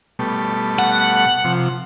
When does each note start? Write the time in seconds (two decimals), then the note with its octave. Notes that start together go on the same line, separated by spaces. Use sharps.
0.19 B2 G3 A3
0.79 F#5
1.44 C3 F3